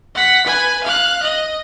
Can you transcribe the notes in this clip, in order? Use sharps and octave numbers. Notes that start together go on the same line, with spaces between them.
F#5 B6
B4 G#5
F5 F#6
D#5